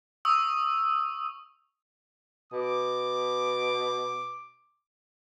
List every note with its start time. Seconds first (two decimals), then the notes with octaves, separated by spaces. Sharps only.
0.25 C#6 D#6 E6
2.52 B2 D6